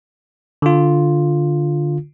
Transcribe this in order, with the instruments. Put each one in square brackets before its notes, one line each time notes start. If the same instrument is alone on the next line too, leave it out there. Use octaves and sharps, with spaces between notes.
[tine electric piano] D3 F4